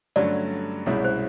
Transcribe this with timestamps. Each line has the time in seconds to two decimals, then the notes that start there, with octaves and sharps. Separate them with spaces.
0.16 G2 D3 F#3 A3 C#4 D5
0.86 C2 B2 G#3 C#4 E4 C#5
1.04 C5